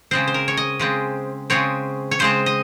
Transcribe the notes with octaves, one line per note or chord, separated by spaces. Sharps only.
C#3 G#3 C4 C5
C5
A#4
C#5
D#5
C#3 G#3 C4
C#3 G#3 C4 C#5
C#5
C#3 G#3 C4 C5
D#5